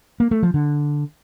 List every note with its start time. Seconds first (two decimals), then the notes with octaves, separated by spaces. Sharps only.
0.20 A#3
0.31 A3
0.43 F3
0.54 D3